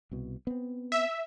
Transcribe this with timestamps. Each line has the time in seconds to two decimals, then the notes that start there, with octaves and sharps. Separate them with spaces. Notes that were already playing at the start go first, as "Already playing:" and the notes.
0.11 C2 B2
0.47 B3 C4
0.92 E5